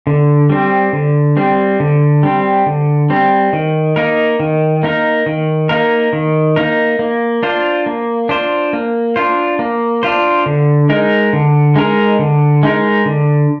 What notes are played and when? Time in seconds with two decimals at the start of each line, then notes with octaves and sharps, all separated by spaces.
0.07 D3
0.49 G3 C4
0.93 D3
1.37 G3 C4
1.80 D3
2.23 G3 C4
2.66 D3
3.10 G3 C4
3.53 D#3
3.96 A#3 D#4 A#4
4.40 D#3
4.83 A#3 D#4 A#4
5.26 D#3
5.69 A#3 D#4 A#4
6.13 D#3
6.56 A#3 D#4 A#4
6.99 A#3
7.43 D4 F4 C5
7.86 A#3
8.29 D4 F4 C5
8.73 A#3
9.16 D4 F4 C5
9.59 A#3
10.03 D4 F4 C5
10.46 D3
10.89 G#3 D#4 A#4
11.33 D3
11.76 G#3 D#4 A#4
12.19 D3
12.63 G#3 D#4 A#4
13.06 D3